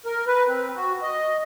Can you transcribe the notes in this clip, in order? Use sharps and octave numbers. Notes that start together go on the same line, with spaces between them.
A#4
B4
C4
F#4
D#5